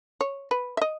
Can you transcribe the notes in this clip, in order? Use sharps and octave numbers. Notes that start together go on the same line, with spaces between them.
C#5
B4
E5
D#5